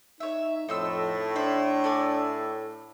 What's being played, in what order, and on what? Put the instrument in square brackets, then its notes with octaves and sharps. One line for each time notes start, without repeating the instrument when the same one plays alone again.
[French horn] D#4 [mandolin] C#5 E5
[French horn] F2 [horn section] A2 [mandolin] D#4 C6 E6
[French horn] D4 [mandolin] C5 E5 B5
[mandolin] A4 D5 G#5